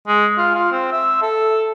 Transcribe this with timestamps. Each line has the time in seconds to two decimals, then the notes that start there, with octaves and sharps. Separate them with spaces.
0.08 G#3
0.38 F4
0.55 F4
0.72 C4
0.92 E5
1.22 A4